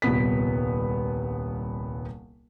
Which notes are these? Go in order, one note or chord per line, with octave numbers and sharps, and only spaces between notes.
D#1 C2 B3 B6